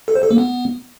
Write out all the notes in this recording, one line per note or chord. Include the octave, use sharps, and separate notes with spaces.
A4
C5
A4
A#3
B3